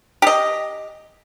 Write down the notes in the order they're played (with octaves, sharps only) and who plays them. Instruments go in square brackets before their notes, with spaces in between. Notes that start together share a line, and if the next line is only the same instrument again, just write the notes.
[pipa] G4 D#5